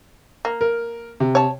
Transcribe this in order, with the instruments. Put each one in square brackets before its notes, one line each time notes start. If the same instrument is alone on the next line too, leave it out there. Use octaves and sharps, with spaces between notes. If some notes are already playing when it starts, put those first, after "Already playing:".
[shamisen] A#3
[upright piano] A#4
C3
[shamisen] C#5 A5